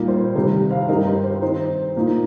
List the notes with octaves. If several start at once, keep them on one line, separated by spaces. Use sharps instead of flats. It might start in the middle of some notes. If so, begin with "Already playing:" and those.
Already playing: A#2 G3 A#3 D#4
C5
C3 D#3 G3 C5
C5 F5
G2 G3 D#4 A#4 D#5
C5
C5
D#3 C4 D#4 C5
A#2 A#3 D#4